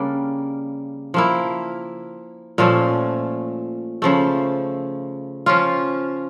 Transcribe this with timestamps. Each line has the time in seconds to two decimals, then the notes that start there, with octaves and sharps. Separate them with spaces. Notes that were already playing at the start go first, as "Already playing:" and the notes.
Already playing: C#3 G3 A#3 D4
1.14 F3 A#3 E4
2.58 A#2 F3 A3 C#4
4.02 C#3 F3 A3
5.46 F3 C#4 F4